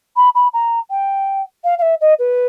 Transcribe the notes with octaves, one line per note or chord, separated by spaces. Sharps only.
B5
B5
A#5
G5
F5
F5
E5
D#5
B4